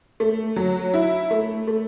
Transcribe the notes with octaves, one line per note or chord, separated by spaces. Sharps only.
A3
F#3
E4
A3
A3